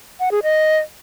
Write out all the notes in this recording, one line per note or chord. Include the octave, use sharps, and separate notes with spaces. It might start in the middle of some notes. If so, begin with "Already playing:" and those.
F#5
G#4
D#5